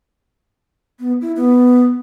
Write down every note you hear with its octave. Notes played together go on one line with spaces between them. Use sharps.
B3
E4
B3